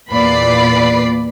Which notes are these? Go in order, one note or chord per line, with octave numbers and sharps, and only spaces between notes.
E2 A#2 B4 D5 B5 C7